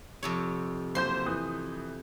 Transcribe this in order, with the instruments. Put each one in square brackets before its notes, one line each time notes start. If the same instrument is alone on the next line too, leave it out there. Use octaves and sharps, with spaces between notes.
[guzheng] F2 C3 C#5
[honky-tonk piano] F#1 C5 G6 [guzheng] C6
[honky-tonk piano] E3 D#6